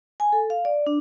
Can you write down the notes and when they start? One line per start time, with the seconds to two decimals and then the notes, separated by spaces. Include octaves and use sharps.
0.20 G#5
0.33 A4
0.50 F5
0.65 D5
0.87 D4